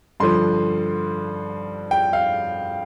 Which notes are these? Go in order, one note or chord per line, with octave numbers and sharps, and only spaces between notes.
G2 D3 F3 C6
G5
F5